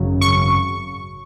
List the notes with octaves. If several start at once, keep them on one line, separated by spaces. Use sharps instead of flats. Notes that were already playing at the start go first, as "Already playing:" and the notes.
Already playing: G#1 F#2 C#3 F#3
C#6